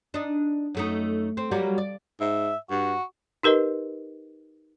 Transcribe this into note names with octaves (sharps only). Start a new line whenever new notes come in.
D4 D#4
F#2 A3 D#4
C4
F#3 G3 A#3
D5
G#2 E5
G2 F#4
D#4 G4 A#4 B4 D#5